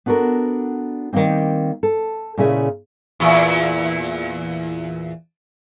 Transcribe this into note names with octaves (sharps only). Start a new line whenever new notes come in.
B3 D4 F#4 A4 A#4
D#3 F3 G3 A#3 C4
A4
A#2 C#3 C#4 E4 G#4 E5
E2 A#2